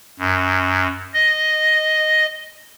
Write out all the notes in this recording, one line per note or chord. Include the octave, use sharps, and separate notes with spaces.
F#2
D#5